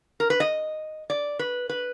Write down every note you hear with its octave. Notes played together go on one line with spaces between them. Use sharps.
A#4
B4
D#5
D5
B4
B4